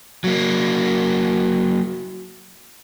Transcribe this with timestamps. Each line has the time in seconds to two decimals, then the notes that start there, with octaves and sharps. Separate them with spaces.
0.24 F#3 A#3